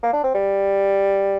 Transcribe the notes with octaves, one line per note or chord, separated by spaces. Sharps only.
A#3
D4
C4
G3